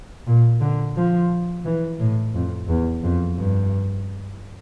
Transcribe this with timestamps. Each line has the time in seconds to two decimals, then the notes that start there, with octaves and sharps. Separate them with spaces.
0.27 A#2
0.61 D3
0.97 F3
1.65 E3
2.00 A2
2.35 F2
2.68 E2
3.03 F2
3.37 G2